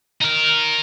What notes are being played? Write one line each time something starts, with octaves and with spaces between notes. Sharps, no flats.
D#4 A#4